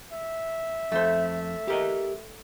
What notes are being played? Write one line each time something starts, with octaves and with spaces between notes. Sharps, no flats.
E5
F2 A3 C5
G4 A#4 D#5